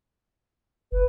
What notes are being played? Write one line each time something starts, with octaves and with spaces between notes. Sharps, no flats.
F#1 B4